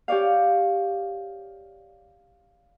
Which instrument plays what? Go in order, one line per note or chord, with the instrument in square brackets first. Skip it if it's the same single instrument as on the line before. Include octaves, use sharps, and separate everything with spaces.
[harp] G4 C#5 D5 F5